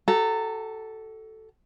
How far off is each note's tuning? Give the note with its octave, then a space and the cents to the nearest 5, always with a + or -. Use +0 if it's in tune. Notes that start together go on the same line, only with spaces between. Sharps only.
F#4 +45 A4 +0 A#5 -30